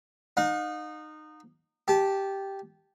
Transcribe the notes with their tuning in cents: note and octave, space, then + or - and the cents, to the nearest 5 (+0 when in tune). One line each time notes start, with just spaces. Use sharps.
D#4 -20 F5 +45
G4 -5 A5 -20